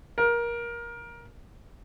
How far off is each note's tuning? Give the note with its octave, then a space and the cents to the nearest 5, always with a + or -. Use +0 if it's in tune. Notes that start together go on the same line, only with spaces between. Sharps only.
A#4 +20